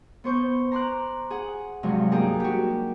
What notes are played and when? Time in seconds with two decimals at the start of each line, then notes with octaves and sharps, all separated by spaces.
0.24 B3 C5 C#6 G6
0.72 A#5 C6 D6 F#6
1.30 G#4 F#5
1.83 G2 C3 F3 F#3 G#3
2.11 A#3 D4 D#4 G4 G#4
2.40 F#4 G4